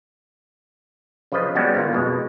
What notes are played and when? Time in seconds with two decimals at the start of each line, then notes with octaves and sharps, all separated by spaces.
1.32 C#3 F3 F4 B4 D#5
1.55 G3 G#3 B3 C#4 F#4
1.75 G1 A#3 F4
1.93 F2 B2 G#3